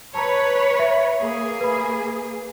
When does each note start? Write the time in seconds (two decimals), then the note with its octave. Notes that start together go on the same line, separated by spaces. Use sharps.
0.15 B4 C#5 A5 A#5
0.79 E5
1.20 A#3 G#4
1.60 B4 B5